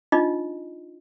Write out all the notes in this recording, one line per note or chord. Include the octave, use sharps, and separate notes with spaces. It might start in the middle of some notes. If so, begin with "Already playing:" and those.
D4 D#4 F4 D#5